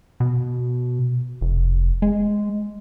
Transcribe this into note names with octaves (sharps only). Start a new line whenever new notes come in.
B2
F1
G#3